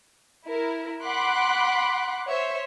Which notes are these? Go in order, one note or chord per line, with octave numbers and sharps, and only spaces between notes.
E4 A#4
F#5 B5 C6 D6 F#6
C5 C#5 E5